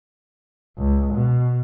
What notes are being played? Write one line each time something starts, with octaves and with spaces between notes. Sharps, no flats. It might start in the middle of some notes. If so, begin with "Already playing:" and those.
C#2
B2